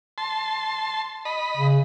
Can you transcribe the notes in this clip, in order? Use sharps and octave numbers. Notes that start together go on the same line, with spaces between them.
A5 C6
D#5 B5
C#3